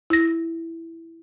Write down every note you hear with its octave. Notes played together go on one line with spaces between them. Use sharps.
E4 A#6